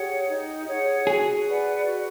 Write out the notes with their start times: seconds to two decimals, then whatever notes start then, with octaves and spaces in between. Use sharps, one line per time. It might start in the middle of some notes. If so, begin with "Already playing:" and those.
Already playing: G4 G#4 C#5 F#5
0.29 D#4
0.67 G#4 C#5 F#5
1.06 F#4 G#4
1.46 B4 D5 F#5
1.85 F#4